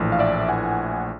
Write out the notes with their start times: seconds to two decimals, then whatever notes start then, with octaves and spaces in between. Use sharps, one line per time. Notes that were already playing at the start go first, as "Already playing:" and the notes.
Already playing: A#1 A2 E3
0.12 F5
0.19 D5 E5
0.48 F#5 G#5